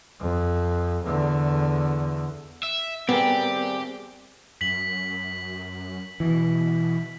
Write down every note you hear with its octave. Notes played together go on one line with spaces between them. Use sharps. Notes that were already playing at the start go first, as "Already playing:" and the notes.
F2
E2 D3
E5
G3 B3 C4 G4 G#4 A#4
F#2 B6 F#7
B2 E3